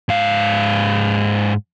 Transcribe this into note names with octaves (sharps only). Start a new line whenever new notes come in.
G#2 F5